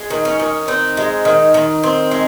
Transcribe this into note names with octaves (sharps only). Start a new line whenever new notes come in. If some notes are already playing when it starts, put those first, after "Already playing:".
Already playing: G#3
D#3
C#4
D#3
C4 D#4
G#3
D#3
D#3
C4
G#3